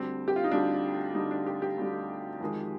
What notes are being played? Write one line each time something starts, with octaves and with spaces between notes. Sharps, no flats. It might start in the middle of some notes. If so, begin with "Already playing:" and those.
Already playing: D2 D3 G3 C4
G4
F4
D#4
D2 D3 G3 D4
D2 D3 G3 D#4
D4
G4
G4
D2 D3 G3
F2 D#3 G#3